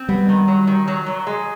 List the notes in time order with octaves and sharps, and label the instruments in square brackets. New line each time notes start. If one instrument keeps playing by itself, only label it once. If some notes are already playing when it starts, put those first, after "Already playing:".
Already playing: [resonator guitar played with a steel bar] C4
[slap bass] G3 [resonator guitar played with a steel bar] B3
[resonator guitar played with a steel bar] D#3
F#3
D#3
F#3
F#3
G#3